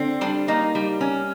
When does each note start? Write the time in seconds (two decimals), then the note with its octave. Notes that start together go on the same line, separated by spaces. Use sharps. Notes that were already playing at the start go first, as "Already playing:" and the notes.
Already playing: D3 C4
0.21 G3 D4
0.48 A#3 D#4
0.75 G3
1.01 C#4